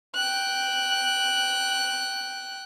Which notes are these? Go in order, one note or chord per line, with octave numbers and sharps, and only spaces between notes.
G5 F#6